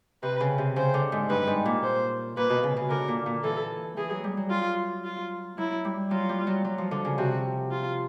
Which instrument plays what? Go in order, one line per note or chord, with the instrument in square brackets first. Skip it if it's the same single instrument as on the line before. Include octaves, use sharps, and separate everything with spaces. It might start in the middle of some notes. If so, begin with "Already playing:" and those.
[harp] C3 [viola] B4
[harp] C#3
C3
[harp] C#3 [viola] C5
[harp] D3
G#2
[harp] G2 [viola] B4
[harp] G#2
A#2
[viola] C5
[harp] A#2 [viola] B4
[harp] B2
C#3
C#3
[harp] D3 [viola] A#4
[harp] A#2
A#2
[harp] E3 [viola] A4
[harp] E3 [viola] G#4
[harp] F#3
G3
F#3
[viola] F4
F4
[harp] F#3 [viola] E4
[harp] G3
[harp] F#3 [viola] F4
[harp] G3
F#3
F#3
F3
D3
C#3
[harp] C3 [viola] F#4
[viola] F4